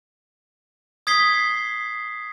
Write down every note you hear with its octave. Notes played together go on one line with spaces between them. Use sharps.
D#6 G#6 B6 C7 G7